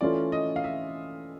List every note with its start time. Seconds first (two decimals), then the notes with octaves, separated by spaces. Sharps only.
0.01 E3 A3 C#4 F4 A4 D5
0.32 D#5
0.56 F5
0.64 E5